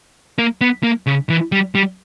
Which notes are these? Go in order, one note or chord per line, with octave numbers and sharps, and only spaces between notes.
A#3
B3
A#3
C#3
E3
G3
G3